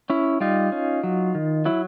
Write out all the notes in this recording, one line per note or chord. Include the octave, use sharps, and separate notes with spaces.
C#4 E4
G3 D#4 F4
C#4
F#3
D#3
F#3 E4